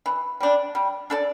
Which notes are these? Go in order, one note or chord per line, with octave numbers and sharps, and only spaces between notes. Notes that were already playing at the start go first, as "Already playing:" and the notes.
E3
G3 D4
G3
D4 A4 D5